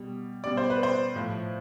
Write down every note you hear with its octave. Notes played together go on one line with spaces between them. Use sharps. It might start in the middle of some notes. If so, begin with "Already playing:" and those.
Already playing: B2 G3
B2 G3 D5
C5
B4
C5
A2 F3